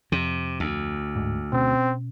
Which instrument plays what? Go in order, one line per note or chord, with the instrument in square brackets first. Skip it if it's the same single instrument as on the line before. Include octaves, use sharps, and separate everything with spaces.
[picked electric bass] F2 [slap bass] C3
[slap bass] D2
[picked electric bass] D1 G1 G#2
[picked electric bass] B2 C#4 [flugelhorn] C4